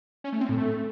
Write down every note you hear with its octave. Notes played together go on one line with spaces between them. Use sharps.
C#4
A3
C4
A2
A3